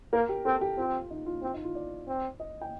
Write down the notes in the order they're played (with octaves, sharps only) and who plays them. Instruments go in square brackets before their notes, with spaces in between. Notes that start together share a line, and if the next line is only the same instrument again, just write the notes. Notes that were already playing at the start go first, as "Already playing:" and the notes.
[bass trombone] A#3 [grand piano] A#4
[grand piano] G4
[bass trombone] C4 [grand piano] A4
[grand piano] G4
[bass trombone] C4 [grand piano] F4
[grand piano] D#4
F4
[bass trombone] C4 [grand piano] F4
[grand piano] D#4
F4
D5
[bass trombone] C4
[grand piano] D#5
G5